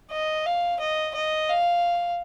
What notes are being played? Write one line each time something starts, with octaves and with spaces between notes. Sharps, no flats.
D#5
F5
D#5
D#5
F5